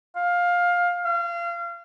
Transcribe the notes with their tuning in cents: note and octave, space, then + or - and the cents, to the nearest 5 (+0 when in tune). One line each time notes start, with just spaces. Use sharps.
F5 +15
F5 -30